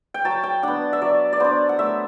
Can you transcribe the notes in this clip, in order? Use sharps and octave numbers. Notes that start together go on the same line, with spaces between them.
G5
F#3 A5
G5
B3 D4 F#5
E5
F#3 D5
D5
B3 D4 C5
F#5
A3 E5